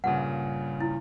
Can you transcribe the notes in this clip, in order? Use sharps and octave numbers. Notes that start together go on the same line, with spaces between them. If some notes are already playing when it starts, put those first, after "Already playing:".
G2 A#2 C#3 F#5
E4